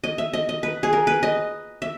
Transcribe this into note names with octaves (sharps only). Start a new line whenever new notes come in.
D#5
E5
D#5
D#5
B4
G#4
A#4
B4
D#5
E5